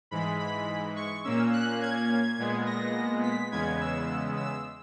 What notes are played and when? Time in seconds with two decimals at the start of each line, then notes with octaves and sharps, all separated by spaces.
0.11 G#2 E3 G#3 B5
0.39 B5
0.96 C#6
1.24 A#2 A#3 C#4 E6
1.53 F#6
1.81 G#6
2.38 A#2 G#3 B3
2.66 A#6
3.23 B6
3.51 E2 C#3 G#3 B3 G#6
3.81 E6
4.37 E6